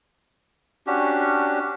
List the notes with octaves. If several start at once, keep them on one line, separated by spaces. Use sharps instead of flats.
C#4 D4 F#4 G4